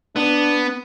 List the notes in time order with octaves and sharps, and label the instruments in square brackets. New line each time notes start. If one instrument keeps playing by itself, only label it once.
[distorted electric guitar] B3 [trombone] D4